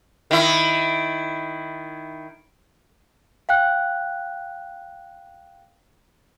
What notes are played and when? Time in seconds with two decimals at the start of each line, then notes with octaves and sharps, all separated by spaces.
0.31 D#3 E4
3.49 F5 G5 F#6